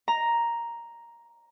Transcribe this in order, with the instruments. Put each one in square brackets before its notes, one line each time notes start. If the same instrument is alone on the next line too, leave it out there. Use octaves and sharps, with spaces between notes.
[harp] A#5